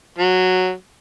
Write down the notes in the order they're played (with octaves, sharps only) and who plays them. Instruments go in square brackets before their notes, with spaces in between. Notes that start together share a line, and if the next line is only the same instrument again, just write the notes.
[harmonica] F#3